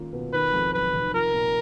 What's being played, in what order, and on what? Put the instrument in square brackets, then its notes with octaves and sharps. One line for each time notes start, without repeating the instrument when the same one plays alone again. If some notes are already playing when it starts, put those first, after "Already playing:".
Already playing: [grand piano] D#2 A#3 C#4 F4
B2
[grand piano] D#3 [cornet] B4
[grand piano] F2
[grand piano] F#3 [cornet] B4
[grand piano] F1
[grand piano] F3 [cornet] A#4
[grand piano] A#2